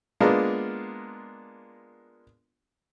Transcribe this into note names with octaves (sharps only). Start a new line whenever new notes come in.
G#3 A#3 B3 D4 F4 A#4